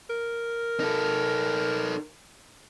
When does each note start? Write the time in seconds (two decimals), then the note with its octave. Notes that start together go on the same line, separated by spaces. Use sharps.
0.10 A#4
0.80 D#4 A4